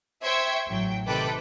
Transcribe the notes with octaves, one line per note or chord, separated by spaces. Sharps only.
C5 E5 G5 C#6 E6 G#6
A1 F#3 G5
C3 D#3 A4 B4 G5 D6